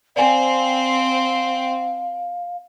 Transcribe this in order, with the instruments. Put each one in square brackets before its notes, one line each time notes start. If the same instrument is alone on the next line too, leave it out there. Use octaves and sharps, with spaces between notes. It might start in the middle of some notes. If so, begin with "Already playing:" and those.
[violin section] C4 [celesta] D5 G#5 [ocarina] F5